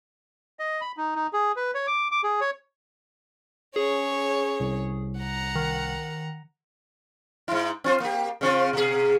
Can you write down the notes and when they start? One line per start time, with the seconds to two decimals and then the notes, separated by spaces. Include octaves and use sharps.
0.59 D#5
0.81 B5
0.97 D#4
1.16 D#4
1.33 G#4
1.56 B4
1.75 C#5
1.87 D6
2.12 D6
2.23 G#4
2.41 C#5
3.76 C#4 G#4 C#5
4.60 C2
5.19 F#5 A#5
5.55 D#3
7.48 G#2 E4
7.84 C4 F4 C5
8.00 A#3 G4
8.41 C#3 C4 F4
8.73 B2 G#4